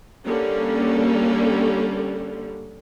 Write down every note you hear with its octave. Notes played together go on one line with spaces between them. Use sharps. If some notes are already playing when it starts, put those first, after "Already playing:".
D3 G3 A#3 C#4